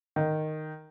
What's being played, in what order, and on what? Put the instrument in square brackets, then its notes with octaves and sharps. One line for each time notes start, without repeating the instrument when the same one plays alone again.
[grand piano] D#3